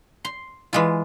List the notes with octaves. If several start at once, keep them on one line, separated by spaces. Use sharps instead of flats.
C6
E3 G#3 F4